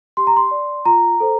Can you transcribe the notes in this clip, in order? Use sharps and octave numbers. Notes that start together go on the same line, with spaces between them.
G4 C6
A#5
C6
D5
F4 A#5
A4 C5